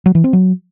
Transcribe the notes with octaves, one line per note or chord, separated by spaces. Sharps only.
F#3
E3
C4
F#3